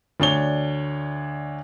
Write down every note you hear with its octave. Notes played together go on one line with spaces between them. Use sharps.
D2 D4 C#5 G7